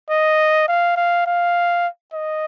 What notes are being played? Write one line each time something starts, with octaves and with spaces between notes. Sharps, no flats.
D#5
F5
F5
F5
D#5